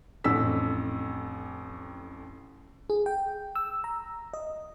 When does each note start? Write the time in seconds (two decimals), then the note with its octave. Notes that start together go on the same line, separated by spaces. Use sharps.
0.24 A1 F2 D4 E6 B6
2.90 G#4
3.06 G5
3.55 E6
3.84 A#5
4.34 D#5